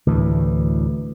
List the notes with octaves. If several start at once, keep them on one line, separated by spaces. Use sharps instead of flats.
D2 A2 E3